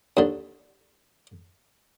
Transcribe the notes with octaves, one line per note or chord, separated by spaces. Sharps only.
D#2 D3